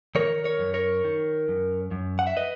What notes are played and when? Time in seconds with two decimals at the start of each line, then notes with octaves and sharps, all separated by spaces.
0.15 D#3 A#4 C#5
0.44 A#4 C#5
0.59 F#2
0.74 A#4 C#5
1.04 D#3
1.48 F#2
1.91 F#2
2.19 F#5
2.27 E5
2.37 B4 D#5